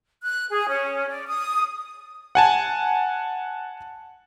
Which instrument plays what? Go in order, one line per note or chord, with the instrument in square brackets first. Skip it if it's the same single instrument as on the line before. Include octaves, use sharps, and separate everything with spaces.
[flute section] F#6
G#4
C#4
D5
D#6
[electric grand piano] F#5 G#5 A5